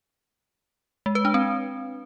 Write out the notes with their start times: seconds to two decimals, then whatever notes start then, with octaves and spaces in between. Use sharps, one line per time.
1.06 G#3
1.15 B4
1.25 D4
1.34 C4